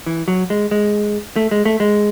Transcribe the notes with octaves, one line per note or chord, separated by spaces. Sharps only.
E3
F#3
G#3
G#3
A3
G#3
A3
G#3